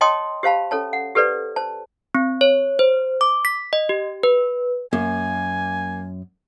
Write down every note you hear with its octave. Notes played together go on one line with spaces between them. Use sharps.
C#5 D#5 G5 A5 C6 D#6
G4 C5 F5 A5 B5
C#4 A4 C#5 A5
F#5
G4 A4 B4 C5 D5
C5 A5
C4
C#5
C5
D6
B6
D#5
G4
B4
F#2 A#3 G#5